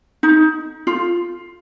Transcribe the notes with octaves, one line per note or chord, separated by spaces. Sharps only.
D#4
F4